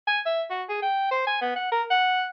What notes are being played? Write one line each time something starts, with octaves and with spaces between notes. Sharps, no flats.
G#5
E5
F#4
G#4
G5
C5
G#5
B3
F#5
A#4
F#5